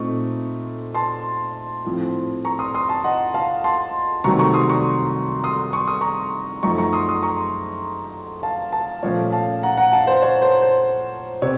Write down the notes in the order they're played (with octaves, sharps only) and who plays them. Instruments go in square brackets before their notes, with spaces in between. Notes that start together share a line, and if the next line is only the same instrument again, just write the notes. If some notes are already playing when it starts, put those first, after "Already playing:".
Already playing: [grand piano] A#2 A3 C4 D#4 C#6
A5 C6
A2 F3 C4
A#5 C#6
C6 D#6
C6 D#6
A5 C6
D#5 F#5
F5 A5
A5 C6
C2 C3 D#3 F#3 A3 A#5 C#6
A#5 C#6
C6 D#6
A#5 C#6
C6 D#6
C#6
D#6
A#5 C#6
F#2 F3 A3 D#4 A#5 C#6
A#5 C#6
C6 D#6
C6 D#6
A#5 C#6
F5 A5
F5 A5
A#2 F3 A3 C#4 C#5 F5
F5 A5
F#5 A#5
F#5 A#5
F5 A5
C5
C#5
C5
C5
C3 C#5